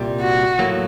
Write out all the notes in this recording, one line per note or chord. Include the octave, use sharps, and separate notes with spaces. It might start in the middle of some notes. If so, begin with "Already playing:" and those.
Already playing: C2 A#2 G3
F#4
A2 F#3 A#3